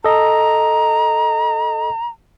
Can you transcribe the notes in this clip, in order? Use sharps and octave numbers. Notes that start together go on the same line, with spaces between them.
A4 D#5 A#5